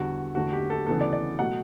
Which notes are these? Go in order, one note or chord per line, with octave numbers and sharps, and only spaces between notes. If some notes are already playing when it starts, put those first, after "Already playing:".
Already playing: E2 D3 G3 F#4
E2 D3 A3 F#4
G4
A4
D2 C#3 E3 B3 A4
D5
D5
B2 F#3 A3 F#5